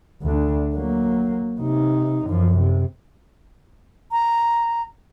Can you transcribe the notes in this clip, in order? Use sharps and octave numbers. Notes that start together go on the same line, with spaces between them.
D2 D4
F#3 A#3
C3 D#4
F#2 F3
C3
A#5